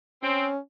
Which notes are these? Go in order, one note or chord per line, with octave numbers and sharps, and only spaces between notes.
C4 C#4